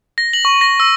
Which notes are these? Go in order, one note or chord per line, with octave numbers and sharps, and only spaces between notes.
A#6
F#7
C#6
A#6
E6